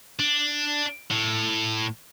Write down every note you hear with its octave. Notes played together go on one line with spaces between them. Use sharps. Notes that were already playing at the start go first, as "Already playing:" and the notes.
D4
A2